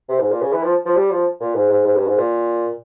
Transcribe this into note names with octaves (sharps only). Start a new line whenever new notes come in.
C3
G#2
A#2
C#3
E3
F3
F3
G3
F3
A#2
G#2
G#2
G#2
G2
G#2
A#2